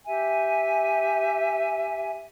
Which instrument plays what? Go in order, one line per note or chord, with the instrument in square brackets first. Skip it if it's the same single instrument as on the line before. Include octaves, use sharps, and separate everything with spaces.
[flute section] G4 E5 G#5